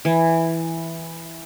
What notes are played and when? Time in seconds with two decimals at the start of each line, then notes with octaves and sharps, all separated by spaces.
0.05 E3